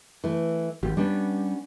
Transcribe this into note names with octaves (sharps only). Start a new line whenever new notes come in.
E3 A3
G#1 G4
G3 B3 C#4 D4